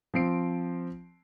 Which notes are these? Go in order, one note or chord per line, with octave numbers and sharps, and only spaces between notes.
F3 C4 C7 D7